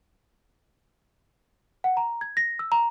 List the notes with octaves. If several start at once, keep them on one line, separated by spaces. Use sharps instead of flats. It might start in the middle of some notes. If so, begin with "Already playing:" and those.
F#5
A#5
G#6
A#6
E6
A#5